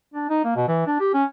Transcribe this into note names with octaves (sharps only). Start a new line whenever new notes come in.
D4
D#4
A#3
B2
E3
D4
G4
C#4